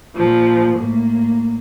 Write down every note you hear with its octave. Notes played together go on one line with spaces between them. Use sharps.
A#2 F3
A2 A#3